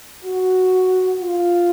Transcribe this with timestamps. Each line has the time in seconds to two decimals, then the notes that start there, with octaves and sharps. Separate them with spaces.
0.24 F#4
1.20 F4